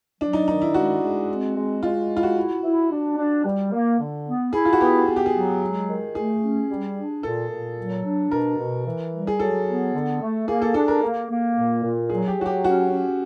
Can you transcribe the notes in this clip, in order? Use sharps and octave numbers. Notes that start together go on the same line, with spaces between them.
F#3 D4
D#4
D#3 D#4
E4
G#3 F#4
G#3
C4
G#3
G#3 F4
E4
F4
F#4
E4
E4
D4
D4
G3
A#3
D3
B3
E4 G#4
F4
F#4
B3 G4
B3 G#4
G4
G#4
F#3
G#3
D#3
A3 G#4
C#4
G3
D4
A#2 A4
A#2
F#3
D4
B2 A#4
B2
E3
G3
G#4
F#3 A4
B3
D3
A3
A#3 G#4
A4
D4 A4
A#4
A#3
A#3
A#2
A#2
F#3 G#4
G4
F#3 F#4
G4
C#4 F#4
C#4